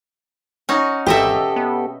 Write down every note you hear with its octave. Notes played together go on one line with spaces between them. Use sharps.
C#4 D#4 F#4
G#1 B2 G4 A4 D#5 E5
B3